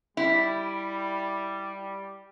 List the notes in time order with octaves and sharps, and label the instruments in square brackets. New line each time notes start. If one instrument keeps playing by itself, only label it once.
[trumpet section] G3 [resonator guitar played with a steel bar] E4